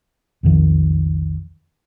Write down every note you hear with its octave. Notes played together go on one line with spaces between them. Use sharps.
B1 F2 D#3 F3